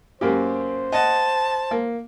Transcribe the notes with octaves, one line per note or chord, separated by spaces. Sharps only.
F#2 A#3 G4 C5
D#5 F#5 A5
A#3